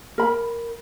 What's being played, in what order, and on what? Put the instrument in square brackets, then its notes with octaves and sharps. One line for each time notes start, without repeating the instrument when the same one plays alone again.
[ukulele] A#4 B5